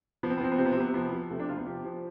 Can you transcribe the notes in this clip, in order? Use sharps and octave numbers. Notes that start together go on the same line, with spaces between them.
F3 B3
C4
B3
F3 C4
B3
C3 C4
B3
C4
C3 B3
C4
F3 B3
F3
C3 A3
D4
C3 F4
B3
F3 G4
F3